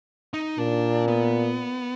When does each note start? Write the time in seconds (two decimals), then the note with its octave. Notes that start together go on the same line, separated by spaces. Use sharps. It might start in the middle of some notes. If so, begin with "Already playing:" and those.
0.34 D#4
0.58 A#2 D4
1.08 B3